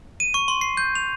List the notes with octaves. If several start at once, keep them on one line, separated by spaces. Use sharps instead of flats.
D#7
C#6
C6
C7
G6
F7